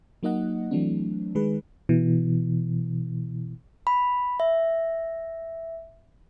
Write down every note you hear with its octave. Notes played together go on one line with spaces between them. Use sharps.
F#3 A#3 D#4 D#5 F#5
E3 F#3 A3 C4 D4
D#3 G#3 G#4 B4
B2 E3
B5
E5